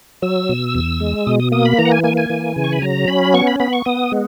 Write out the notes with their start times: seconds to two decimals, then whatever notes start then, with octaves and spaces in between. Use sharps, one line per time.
0.22 F#3 E6
0.49 B2
0.75 E2
1.00 G#3
1.26 B2 D#6
1.40 D#6
1.52 A#3 D#6
1.65 B5
1.78 E3 A#5
1.85 F#5
1.92 G#5
2.04 A#3 G#5
2.17 G#5
2.30 E3
2.56 C#3
2.64 C#6
2.72 B5
2.82 F#3 A#5
3.08 C#4 B5
3.34 B3 C#6
3.47 B5
3.60 B3 B5
3.73 C#6
3.85 B3 D#6
4.12 G#3